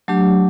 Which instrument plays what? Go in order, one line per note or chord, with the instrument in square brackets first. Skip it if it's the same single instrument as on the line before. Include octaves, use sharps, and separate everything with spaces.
[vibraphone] F#3 A3 D4 G4